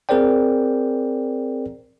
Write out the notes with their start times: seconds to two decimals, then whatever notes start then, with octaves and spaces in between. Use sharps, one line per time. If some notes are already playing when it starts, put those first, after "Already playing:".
0.09 C4 G#4 A#4 C5 D5 G5